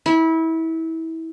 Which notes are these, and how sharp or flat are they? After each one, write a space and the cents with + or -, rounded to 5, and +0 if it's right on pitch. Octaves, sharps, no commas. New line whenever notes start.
E4 -25